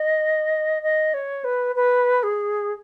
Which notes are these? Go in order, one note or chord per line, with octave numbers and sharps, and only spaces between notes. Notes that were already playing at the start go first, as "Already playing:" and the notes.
Already playing: D#5
D#5
C#5
B4
B4
G#4